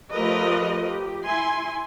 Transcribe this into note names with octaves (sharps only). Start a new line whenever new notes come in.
F3 A3 G4 A#4 B4 D#5
G4
E4 G#5 C6